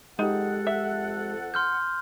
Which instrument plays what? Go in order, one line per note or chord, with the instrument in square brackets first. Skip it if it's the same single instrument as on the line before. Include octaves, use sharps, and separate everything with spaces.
[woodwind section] F2 A4 F#5 [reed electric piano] G#3 G4 [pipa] D#4
[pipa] E5
[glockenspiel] C6 F6 G6